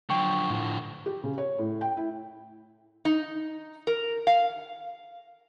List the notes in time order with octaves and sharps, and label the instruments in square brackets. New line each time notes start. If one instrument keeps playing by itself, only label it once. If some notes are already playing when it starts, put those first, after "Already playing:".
[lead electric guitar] D3 F3 [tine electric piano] F#3 G5 C#6
[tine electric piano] A2
[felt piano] G4
C#3
C#5
A2
G5
E4
[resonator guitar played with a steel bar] D#4
A#4
F5